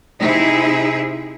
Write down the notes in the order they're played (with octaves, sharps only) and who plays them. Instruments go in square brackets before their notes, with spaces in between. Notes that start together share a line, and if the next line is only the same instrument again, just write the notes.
[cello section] C3 D#4 E4 G#4